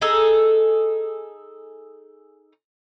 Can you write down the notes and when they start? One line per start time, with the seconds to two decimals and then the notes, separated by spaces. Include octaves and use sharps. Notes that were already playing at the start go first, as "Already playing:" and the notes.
0.02 D#4 G#4 A4